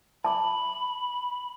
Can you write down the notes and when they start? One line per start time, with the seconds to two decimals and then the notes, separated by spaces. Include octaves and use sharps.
0.25 A5 B5 D6